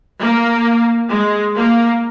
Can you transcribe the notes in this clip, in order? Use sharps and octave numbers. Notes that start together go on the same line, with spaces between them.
A#3
G#3
A#3